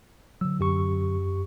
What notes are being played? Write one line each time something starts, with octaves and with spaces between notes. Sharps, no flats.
D3 F#3 E6
F#2 G4 C#6